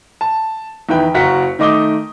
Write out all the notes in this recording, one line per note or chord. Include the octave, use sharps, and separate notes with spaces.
A5
E2 D#3 E4 B4 G5
F#1 F#4 A#4 F#5 B6
D#3 A3 D#5 D6 D#6 G7